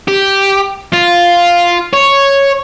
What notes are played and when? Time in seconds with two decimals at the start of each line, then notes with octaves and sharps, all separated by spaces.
0.08 G4
0.93 F4
1.93 C#5